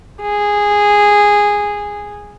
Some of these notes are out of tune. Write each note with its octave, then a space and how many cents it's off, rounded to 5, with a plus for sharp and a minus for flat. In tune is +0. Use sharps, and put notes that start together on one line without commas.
G#4 -10